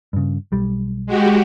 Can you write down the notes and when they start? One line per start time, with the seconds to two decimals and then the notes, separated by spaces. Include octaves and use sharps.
0.13 G2 C#3
0.52 B1 G3
1.06 G#3 F#4 G4